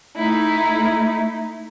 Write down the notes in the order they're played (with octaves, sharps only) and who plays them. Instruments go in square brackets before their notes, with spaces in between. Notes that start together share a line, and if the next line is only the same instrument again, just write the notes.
[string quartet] A3 D#4 E4